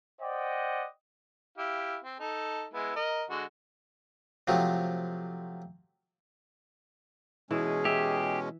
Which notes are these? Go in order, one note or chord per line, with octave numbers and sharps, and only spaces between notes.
C5 D5 D#5 F#5 G5
E4 G4 F5
C4
D#4 A4
G#3 B3 E4
A#4 D#5
D3 G#3 F#4
C3 F3 F#3 A3
B2 E3 G#3 C#4 G#4
G4 E5